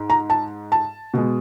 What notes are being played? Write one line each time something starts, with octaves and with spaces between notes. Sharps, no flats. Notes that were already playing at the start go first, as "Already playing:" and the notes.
Already playing: G#2
A#5
A5
A5
B2 G#3